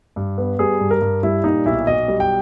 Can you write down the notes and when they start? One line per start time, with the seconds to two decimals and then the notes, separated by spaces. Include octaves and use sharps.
0.16 G2
0.38 B3
0.59 G3 G#4
0.80 G2
0.91 A#4
1.02 G2
1.23 G3 E4
1.44 A#2 D#4
1.66 B1 E4
1.87 B1 D#5
2.08 G3
2.20 G5